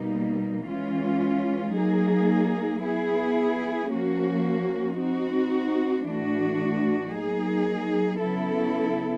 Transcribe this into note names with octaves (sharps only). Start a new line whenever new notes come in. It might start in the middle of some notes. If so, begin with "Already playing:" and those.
Already playing: B2 G3 A#3 D#4
E3 G#3 C#4 F4
F#3 A#3 D#4 G#4
B3 E4 G#4
F3 A#3 C#4 F#4
C4 D#4 F#4
A2 E3 A3 D4 F#4
F#3 A#3 D#4 G#4
C#3 F#3 B3 E4 A4